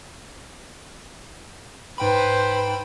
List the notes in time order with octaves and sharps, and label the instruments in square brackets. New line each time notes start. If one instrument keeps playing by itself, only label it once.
[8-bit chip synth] G#2 G5 B5 [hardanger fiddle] B4 C5